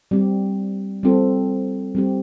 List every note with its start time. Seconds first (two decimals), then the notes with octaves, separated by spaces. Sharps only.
0.11 G3 C4 G4
1.03 G3 C4 F4 A4
1.95 G3 C4 G4